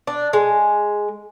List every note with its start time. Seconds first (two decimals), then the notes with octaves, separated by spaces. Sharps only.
0.07 D4
0.33 G#3